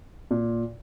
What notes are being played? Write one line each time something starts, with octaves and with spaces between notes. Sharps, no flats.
A#2